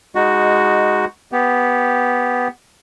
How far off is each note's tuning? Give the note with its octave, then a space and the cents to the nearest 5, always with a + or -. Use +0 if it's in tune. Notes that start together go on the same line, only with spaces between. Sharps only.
G#3 -10 D#4 +0 F#4 +0
B3 +0 G4 +0